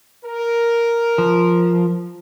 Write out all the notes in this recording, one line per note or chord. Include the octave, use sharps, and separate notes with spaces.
A#4
F3